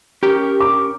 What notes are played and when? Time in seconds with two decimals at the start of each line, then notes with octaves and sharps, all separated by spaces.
0.23 C#4 G4 A#4
0.60 D6